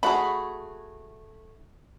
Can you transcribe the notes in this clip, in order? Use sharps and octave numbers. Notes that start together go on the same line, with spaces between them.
A3 F#4 G#4 B5